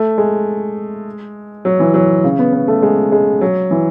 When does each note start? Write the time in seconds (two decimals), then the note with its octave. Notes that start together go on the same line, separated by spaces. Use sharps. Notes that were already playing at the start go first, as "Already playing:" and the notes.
Already playing: A3
0.18 G#3
1.65 F#3
1.80 E3
1.94 F#3
2.24 C#3
2.39 B3
2.53 B3
2.68 A3
2.82 G#3
3.12 G#3
3.41 F#3
3.71 E3